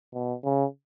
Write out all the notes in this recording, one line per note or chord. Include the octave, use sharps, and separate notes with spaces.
B2
C#3